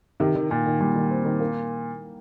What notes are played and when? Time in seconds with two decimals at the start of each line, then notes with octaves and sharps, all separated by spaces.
0.20 C3 D#3
0.35 D#3
0.50 A#2 D#3
0.66 D#3
0.80 A#2 G3
0.96 D#3
1.11 C4
1.25 D#3
1.40 A#3